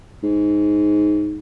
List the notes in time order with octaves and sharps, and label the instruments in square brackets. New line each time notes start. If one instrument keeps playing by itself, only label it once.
[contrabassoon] G#2